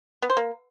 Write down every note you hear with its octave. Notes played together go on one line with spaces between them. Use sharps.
B3
C5
A#3